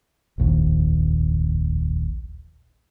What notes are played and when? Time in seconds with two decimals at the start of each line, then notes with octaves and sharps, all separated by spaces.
0.38 F1 A#1 D#2